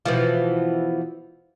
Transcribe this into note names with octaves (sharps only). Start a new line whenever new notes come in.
B2 E3 F3